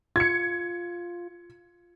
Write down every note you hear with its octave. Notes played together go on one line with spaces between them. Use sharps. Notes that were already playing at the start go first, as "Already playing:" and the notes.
F4 G#6 C#7